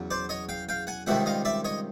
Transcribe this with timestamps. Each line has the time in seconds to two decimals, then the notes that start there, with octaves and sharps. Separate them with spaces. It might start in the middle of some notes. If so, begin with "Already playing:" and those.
Already playing: E2 C#3 F#3
0.11 C5 D5
0.29 C#5 D#5
0.49 F5 G5
0.69 F5 G5
0.87 F#5 G#5
1.07 C#2 C3 D#3 G3 E5 F#5
1.26 D#5 F5
1.45 D5 E5
1.65 C#5 D#5